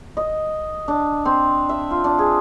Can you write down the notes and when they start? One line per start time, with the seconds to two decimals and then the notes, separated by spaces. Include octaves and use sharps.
0.17 D#5
0.88 D4
1.25 C4
1.69 E5
1.91 F4
2.04 D4
2.19 G#4